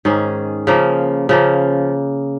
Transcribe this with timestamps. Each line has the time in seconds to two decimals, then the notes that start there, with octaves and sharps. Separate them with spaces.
0.05 G#2 D#3 C#4 G#4
0.67 C#3 F3 A#3
1.29 C#3 F3 A#3